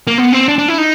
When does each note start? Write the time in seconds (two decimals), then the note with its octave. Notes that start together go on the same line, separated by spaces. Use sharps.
0.07 A#3
0.18 B3
0.32 C4
0.48 D4
0.58 D4
0.68 E4
0.78 D#4